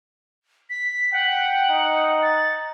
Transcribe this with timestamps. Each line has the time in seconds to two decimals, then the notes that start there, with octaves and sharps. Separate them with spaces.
0.70 B6
1.13 F#5 G5
1.69 D#4
2.22 A6